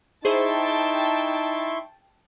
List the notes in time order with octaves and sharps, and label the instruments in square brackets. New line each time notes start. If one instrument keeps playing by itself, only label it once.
[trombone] D#4 [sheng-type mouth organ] E4 C6 C#6 [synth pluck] G#4 C5 [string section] G5 A5